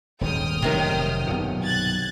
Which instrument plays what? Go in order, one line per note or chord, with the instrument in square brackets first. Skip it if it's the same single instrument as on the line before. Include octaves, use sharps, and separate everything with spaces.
[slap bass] D#1 G#2 B2 [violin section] G5 D#6 F6
[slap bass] F1 [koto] C3 D#3 F#3
[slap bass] B1 G2 A#2
[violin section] F#6 G#6 A6